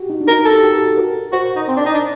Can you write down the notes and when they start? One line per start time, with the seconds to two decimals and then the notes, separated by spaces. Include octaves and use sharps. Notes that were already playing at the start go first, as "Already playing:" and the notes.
Already playing: F#4 G4
0.10 D#4
0.21 D4
0.28 D#4 A#4
0.40 F#4
0.45 A4
0.51 G4
0.63 G4
0.74 F#4
0.87 A4
0.97 A#4
1.33 F#4 C5
1.56 D#4
1.68 C4
1.76 D4
1.85 D#4
1.94 D4